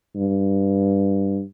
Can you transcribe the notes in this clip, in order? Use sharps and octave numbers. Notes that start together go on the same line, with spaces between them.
G2